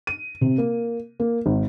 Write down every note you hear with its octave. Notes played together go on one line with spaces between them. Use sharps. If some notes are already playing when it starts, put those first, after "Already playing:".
D#7
C3
A#3
A#3
G#1